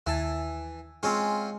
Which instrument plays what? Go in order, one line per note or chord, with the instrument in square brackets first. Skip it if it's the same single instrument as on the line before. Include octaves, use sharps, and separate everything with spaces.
[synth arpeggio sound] D#2 G#5 A5 [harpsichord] E3
[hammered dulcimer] G#3 [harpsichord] C4 C#4 F4 [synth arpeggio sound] C6